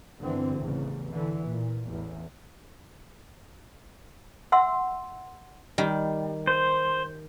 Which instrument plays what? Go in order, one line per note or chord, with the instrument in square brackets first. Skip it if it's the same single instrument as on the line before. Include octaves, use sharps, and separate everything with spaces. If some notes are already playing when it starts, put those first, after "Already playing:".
[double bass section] G1 D3 E3 C4
A1 E2 C#3
D3 E3
A#2
A1 E2
[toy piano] E5 F#5 C6 E6
[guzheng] D#3 G3
[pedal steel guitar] C5